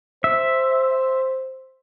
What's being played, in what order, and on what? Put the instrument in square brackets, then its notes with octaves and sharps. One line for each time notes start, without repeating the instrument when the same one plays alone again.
[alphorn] C5 [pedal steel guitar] E5